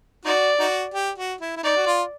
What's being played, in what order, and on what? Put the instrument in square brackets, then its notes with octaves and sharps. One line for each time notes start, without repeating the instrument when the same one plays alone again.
[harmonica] D#4 F#4 [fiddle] D5
[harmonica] D#4 F#4
G4
F#4
E4
E4
[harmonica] D#4 [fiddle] D5
[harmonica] F#4
F4